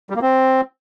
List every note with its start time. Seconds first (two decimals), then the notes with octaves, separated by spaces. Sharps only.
0.10 G3
0.16 A#3
0.22 C4